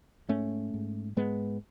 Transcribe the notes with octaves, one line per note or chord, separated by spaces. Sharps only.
G#2 A3 C#4
G#2
G#2 G#3 B3